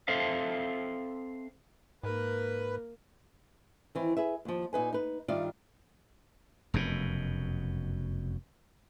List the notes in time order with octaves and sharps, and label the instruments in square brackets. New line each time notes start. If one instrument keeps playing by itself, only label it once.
[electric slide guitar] C4 A4 C5 E5 F5
[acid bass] G#2 [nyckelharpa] A#3 A#4 [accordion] B4
[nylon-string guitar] D#3 E3 C4
G#4 B4 E5
D#2 F3
A#2 D#4 B4 G#5
D#4 B4
G2 D#3 F4 D5 E5
[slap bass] F1 F#2 B2